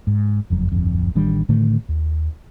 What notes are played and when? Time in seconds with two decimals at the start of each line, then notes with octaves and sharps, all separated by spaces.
0.07 G#2
0.50 F#1 F2 F#3
0.72 D1 G1 F2
1.15 A1 D#3 G3 D4
1.49 A2 D3 D#3 A3
1.89 D#2